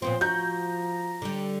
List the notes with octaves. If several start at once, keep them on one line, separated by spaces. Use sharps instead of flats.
A#2 F3 B3 C4 C5
F#4 A#5 G6
D3 G3